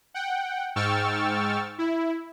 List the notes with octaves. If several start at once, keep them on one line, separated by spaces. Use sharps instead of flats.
F#5 G5
G#2 G5 C#6 E6 F6 A6
E4